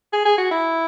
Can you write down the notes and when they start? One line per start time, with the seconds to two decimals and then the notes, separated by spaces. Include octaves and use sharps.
0.13 G#4
0.25 G#4
0.38 F#4
0.51 E4